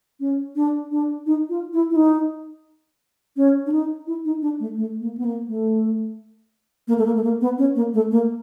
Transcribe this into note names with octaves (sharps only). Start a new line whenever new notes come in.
C#4
D4
D4
D#4
F4
E4
E4
D#4
C#4
D4
D#4
E4
D#4
D4
A3
A3
A#3
B3
A#3
A3
A#3
A3
A#3
A3
A#3
B3
C#4
A#3
A3
A#3